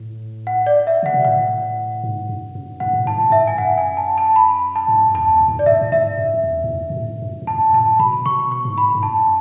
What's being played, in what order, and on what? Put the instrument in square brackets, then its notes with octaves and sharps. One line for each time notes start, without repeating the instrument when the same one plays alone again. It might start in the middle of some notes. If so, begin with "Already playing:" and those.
Already playing: [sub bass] A2
[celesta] F#5
D5
E5
[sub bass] C#3 [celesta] F#5
[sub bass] B2
[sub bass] A2 [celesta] F#5
[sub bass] G#2
F#2
F#2
[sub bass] G#2 [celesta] F#5
[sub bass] A2
[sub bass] G#2 [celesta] A5
[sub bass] A2
[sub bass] G#2 [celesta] E5
[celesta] G#5
[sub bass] F#2 [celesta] F#5
[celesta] G#5
A5
A5
B5
A5
[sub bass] G#2
F#2
[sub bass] E2 [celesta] A5
[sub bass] F#2
G#2
[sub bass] F#2 [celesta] D5
[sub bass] G#2 [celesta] E5
[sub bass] A2
[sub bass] G#2 [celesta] E5
[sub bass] F#2
F#2
E2
G#2
F#2
B2
A2
F#2
G#2
[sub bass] F#2 [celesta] A5
[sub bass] A2 [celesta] A5
[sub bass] B2 [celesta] B5
[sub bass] B2 [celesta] C#6
[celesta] C#6
[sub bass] G#2
[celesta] B5
[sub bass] G#2
[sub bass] F#2 [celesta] A5